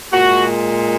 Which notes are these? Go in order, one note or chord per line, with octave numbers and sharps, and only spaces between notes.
A#2 G#3 F#4